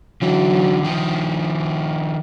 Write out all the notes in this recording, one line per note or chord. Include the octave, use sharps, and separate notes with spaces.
D3 E3 F#3
D#3 F3